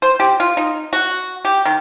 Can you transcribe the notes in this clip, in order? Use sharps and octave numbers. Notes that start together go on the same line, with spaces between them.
C5
G4
F4
D#4
F#4
G4
D#3